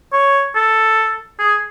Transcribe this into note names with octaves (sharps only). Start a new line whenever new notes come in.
C#5
A4
G#4